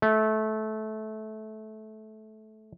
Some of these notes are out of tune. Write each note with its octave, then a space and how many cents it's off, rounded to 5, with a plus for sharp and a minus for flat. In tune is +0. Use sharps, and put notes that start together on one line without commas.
A3 -20